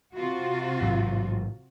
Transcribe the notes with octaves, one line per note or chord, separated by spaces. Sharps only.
C3 F4 F#4
A1 G#2 F#3